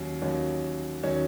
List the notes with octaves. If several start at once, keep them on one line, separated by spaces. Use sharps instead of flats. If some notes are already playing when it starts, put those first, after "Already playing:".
Already playing: D#2 D#3 F#3 C#4
D#2 D#3 F#3 C#4
D#3 F#3 C#4